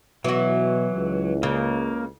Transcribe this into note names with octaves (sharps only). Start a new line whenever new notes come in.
B2 E3 F#3 F#4
C#2
C#3 A#3